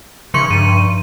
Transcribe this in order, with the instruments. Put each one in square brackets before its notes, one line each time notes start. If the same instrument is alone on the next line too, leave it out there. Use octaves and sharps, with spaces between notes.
[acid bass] C#3 [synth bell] F3 C6 C#6 [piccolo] C#7
[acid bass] G2 [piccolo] D#7